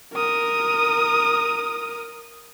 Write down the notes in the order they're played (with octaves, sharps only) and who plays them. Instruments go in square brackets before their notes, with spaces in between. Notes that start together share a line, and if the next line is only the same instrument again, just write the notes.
[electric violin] A#4 D#6